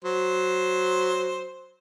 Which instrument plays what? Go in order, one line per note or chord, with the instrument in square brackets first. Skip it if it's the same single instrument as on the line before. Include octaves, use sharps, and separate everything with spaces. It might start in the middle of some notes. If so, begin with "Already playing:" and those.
[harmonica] F#3 C5